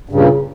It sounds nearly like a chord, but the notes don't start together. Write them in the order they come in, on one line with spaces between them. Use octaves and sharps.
G2 C#3 A#2